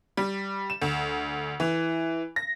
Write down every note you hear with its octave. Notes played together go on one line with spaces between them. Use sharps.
G3
E7
D2
E3
A#6